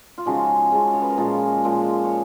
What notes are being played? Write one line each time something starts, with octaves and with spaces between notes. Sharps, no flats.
F4
C#3 F3 G#3 D#4 F#4
C#3 F3 G#3
C#5
B4
A#4
A#2 F3 G#3 F4 G#4
A#2 F3 G#3
C#5